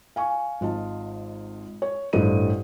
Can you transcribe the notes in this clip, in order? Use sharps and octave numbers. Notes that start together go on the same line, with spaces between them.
F5 G#5 C#6
G#1 F4 D#5 A5
C#5
A1 G2 A4 C5 D#5 D#7